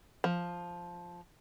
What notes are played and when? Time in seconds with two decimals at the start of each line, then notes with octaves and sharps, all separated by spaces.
0.24 F3